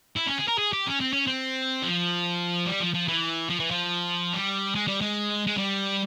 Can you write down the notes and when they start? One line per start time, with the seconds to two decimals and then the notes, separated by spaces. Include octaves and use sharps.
0.17 E4
0.27 C#4
0.38 G#4
0.48 A#4
0.59 G#4
0.73 G4
0.87 C#4
1.01 C4
1.13 C#4
1.27 C4
1.83 F3
2.67 G3
2.80 F3
2.94 F3
3.08 E3
3.49 F3
3.60 E3
3.71 F3
4.33 G3
4.75 G#3
4.87 G3
5.01 G#3
5.47 G#3
5.57 G3